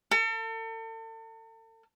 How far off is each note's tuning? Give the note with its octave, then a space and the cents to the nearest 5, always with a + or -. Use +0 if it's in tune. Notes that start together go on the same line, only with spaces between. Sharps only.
A4 +40